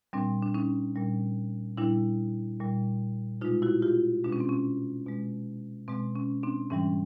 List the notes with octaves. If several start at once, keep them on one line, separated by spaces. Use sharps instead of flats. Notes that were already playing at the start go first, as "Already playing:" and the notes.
A#2 G3 C4 D4
D4
C#4 D#4
A#2 G3
A#2 G3 D4 E4
A#2 G3
B2 G#3 D#4 F4
E4 F#4
F4 G4
B2 G#3 D4
C#4
C4
C#4
B2 G#3
B2 G#3 C4
C#4
C4 D4
G#2 E3 G3 C#4